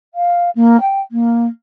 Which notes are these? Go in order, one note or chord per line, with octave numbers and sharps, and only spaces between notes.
F5
A#3
G5
A#3